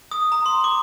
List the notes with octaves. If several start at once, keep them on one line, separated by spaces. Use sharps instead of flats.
D#6
A#5
C6
D6